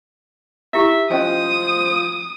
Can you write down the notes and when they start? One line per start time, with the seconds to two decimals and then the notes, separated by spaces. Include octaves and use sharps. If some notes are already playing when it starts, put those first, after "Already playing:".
0.73 D#4 E4 G4 E5
1.11 F3 C#4 C5 D#5 G#5 D#6